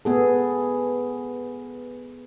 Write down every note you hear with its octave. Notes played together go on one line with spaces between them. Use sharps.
B3 G#4 A4